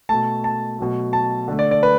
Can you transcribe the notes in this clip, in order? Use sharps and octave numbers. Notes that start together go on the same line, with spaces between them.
B2 A3 A5
A5
B2 F#3 A3
A5
D3 A3
D5
D5
B4